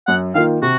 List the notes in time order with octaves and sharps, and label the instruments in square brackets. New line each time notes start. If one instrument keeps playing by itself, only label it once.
[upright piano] F#2 [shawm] F#5
[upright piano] D#3 A#3 F4 [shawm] F5
[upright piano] C3 [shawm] F#4